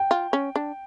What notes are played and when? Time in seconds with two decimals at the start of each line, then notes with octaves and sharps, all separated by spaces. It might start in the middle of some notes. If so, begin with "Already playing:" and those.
Already playing: G5
0.11 F4
0.33 C#4
0.56 D4